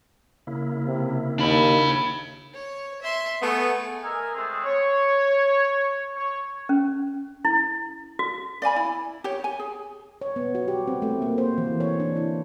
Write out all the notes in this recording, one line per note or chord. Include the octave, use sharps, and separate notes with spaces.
C#3 A#3 E4
C3
D#2 D4 B5
C#5
E5 C6
A3 B3 G#4
A#4 D#5 E5 G#5
G#3 A3 C4 G#4
C#5
C#5
C#4
E4
F#4
D5 F5 G#5 B5
E4
G4 C#5
G#5
G#4
C#5
B3
F#4
G4
C4
A3
A#3
C5
E3
C#5
D4
E4